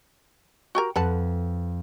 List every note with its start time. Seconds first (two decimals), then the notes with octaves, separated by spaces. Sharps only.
0.75 F#4 G4 A#4
0.96 F2 B4 F#5 A5